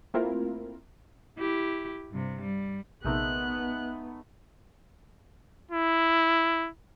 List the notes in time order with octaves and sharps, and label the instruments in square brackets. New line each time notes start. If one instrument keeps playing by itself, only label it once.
[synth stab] A3 A#3 C4 E4 F4 A#4
[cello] E4 G4
G2 C3
G3
[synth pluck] A#1 C3 A#4 [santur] G#3 A3 D#4 [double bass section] B3 [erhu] F#6
[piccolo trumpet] E4